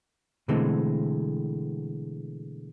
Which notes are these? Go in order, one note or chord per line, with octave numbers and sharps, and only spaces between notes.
B2 D3 E3 G#3 A3 C4